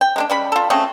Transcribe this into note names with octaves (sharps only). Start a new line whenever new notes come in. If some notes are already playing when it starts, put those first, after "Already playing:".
G5
G#3 A#3 D4
C#3 G3 B5
F4 A4
A3 C4 C#4 G#4